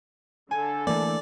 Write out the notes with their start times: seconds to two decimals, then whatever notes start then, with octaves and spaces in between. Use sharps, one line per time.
0.51 D3 A4 G#5
0.87 E3 A3 A#3 D5